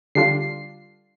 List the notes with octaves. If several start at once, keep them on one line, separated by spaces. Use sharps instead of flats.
D3 G3 D4 F4 C7